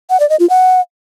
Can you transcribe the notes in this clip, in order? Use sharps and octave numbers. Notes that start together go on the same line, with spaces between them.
F#5
D5
D#5
F4
F#5